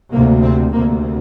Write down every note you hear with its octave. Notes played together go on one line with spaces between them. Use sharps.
D2 C3 A#3
C4
D2 C3 A#3